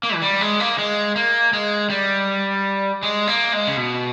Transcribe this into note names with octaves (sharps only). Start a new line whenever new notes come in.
A#3
E3
G3
G#3
A#3
G#3
A#3
G#3
G3
G#3
A#3
G#3
C#3
B2